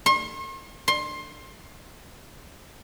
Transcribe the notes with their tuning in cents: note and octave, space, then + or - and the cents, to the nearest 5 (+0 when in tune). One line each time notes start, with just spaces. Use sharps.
C6 +45
C6 +25